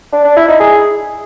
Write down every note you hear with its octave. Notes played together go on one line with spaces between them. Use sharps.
D4
D4
E4
D#4
G#4